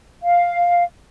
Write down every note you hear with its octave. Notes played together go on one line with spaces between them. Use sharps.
F5